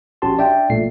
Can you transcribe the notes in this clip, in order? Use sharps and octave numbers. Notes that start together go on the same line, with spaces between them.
A#1 C#4 F#4 G4 A5 C6
D4 D5 E5 G5
A#1 A#2 A3 C7